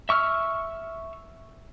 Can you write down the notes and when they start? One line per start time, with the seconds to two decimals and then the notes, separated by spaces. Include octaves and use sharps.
0.09 E5 C#6 E6 F6